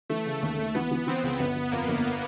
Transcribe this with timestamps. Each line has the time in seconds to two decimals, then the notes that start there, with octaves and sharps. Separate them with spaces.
0.10 E3 A3
0.25 C#3
0.43 D#2
0.58 D#2
0.75 E3 B3
0.91 E3
1.07 E3 C4
1.24 C#2
1.39 G1 B3
1.56 G1
1.71 F2 A#3
1.88 G1